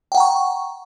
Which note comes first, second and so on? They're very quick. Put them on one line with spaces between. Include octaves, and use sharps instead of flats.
G5 F#5 A#5 C#6